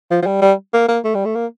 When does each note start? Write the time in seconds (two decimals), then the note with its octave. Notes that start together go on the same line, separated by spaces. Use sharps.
0.11 F3
0.22 F3
0.26 G3
0.42 G3
0.73 A#3
0.88 A#3
1.04 A3
1.15 G3
1.25 A3
1.35 A#3